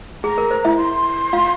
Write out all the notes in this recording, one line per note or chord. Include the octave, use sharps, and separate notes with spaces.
G#4 A#5
A#4
C5
E4 E5
C6
F4 F5